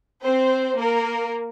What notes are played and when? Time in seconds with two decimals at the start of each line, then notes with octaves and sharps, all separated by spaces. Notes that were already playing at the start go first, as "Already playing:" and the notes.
0.23 C4 C5
0.79 A#3 A#4